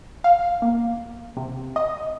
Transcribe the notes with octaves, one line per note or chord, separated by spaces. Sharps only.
F5
A#3
C3
D#5